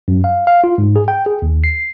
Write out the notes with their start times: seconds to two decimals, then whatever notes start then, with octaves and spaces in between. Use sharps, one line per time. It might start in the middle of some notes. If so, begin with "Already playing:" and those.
0.08 F#2
0.24 F5
0.47 F5
0.64 F4
0.78 G#2
0.96 G#4
1.08 G5
1.26 G#4
1.42 D#2
1.64 C7